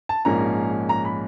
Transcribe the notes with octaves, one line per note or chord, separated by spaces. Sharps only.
A5
A#1 G#2 F3 A#3 C#4 A#5
A#5
B5